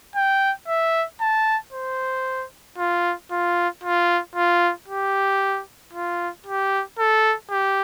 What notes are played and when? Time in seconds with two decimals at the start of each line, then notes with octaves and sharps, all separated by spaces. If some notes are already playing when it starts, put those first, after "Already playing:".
0.16 G5
0.68 E5
1.21 A5
1.73 C5
2.78 F4
3.31 F4
3.84 F4
4.36 F4
4.88 G4
5.93 F4
6.47 G4
6.99 A4
7.51 G4